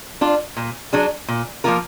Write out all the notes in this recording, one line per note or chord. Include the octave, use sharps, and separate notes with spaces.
D4 F4
A#2
F#3 D4 G#4
A#2
F3 A#3 F4 A#4